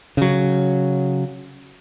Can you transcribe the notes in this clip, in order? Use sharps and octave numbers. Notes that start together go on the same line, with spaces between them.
C#3 F#3